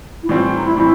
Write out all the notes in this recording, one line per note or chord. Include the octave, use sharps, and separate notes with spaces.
E4
A2 E3 G3 C4 F4
D#4
E4
A2 E3 G3 C4 E4